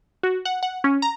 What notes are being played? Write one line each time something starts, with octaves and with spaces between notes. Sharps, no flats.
F#4
F#5
F#5
C#4
A#5